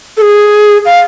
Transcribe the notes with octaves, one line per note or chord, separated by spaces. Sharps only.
A4
G#4
F5